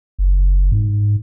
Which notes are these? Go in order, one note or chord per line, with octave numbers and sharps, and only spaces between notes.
F#1
G#2